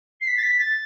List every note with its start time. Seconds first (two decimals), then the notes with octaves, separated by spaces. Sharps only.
0.20 C7
0.27 B6
0.37 A6
0.42 B6
0.59 A6